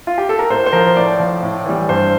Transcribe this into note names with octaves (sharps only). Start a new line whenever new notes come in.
F4
G4
A4
A#4
A2 C5
C5
F3 A#4
A2 D5
F3
A2
E3 G3
G2 C5